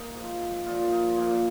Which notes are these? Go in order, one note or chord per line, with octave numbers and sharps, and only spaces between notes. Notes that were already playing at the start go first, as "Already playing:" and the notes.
Already playing: A#3 D#4
G#2 F3
A#2 F3 F4
D#4
A#2 F3 A#3